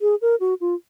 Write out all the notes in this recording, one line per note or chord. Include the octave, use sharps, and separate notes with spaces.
G#4
A#4
F#4
F4